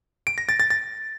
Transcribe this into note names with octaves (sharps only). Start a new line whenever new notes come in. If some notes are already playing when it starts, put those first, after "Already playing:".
D7
A#6
A6
A6
A6